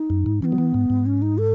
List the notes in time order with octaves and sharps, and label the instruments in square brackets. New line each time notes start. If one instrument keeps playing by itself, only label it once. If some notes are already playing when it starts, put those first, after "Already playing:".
Already playing: [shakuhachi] D#4
[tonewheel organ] F#2
G#2
[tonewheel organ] E3 [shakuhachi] B3 C#4
[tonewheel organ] F#3
E3
G#2
G#2
[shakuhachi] C#4
D#4
A4